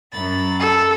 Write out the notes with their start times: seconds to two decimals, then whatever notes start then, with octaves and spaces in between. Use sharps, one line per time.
0.12 F#2 B5 A6
0.60 A4